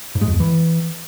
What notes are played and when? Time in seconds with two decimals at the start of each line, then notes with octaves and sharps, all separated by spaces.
0.15 G#2
0.21 G#3
0.28 F2
0.34 E2
0.40 E3